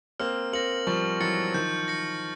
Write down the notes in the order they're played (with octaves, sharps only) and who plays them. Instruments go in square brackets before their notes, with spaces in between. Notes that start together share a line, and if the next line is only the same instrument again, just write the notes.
[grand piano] A#3 C4 [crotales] F6
[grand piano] A#3 C4 [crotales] A#6 C#7 F#7
[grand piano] F3 G3 [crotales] C#6
[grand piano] E3 F#3 [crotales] F6 A6 C#7
[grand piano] D#3 F3 [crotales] G6
[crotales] A#6 C#7